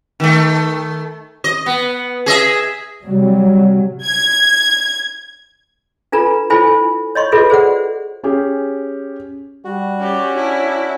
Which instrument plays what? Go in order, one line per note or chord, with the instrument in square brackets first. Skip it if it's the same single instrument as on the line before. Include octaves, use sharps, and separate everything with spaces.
[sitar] D#3 A3
D#5
B3
G#4 D#5 E5
[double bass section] C3 F#3 G3
[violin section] G#6
[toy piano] D4 F4 A4 B4 A#5
E4 F4 A4 C5 G#5 B5
C#5 D#5 C6 C#6
F4 F#4 G#4 A4 B4 E5
G#4 C5 D5 F#5
[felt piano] C#4 G4 G#4
[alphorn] G3 [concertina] F#4
[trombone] C#4 [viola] G4 D5
[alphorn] D4 [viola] E4